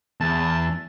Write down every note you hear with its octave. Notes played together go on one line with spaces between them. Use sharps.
E2 A5